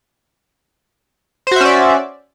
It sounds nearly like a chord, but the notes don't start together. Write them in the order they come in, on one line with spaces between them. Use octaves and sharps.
C5 F#4 E5 C#4 D5